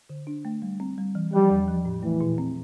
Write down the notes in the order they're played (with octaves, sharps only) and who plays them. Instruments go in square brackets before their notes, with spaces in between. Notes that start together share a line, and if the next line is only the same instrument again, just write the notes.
[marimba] D3
D4
A3
G3
C4
G3
E3
[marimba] F3 [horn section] G3
[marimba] E2
F3
A2
[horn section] E3 [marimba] A3
[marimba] A#2
C4